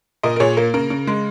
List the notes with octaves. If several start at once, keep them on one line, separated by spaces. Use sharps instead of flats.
A#2 A#4 D#5
A#4
A#2 G#4 C#5
A#3 A#4
C#3 A#4
C#3
G#3